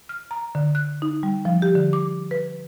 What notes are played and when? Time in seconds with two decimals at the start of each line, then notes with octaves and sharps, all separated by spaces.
0.09 F6
0.31 A#5
0.55 D3
0.75 F#6
1.02 D#4
1.23 G3
1.45 F3
1.62 G4
1.75 D3
1.93 D6
2.31 B4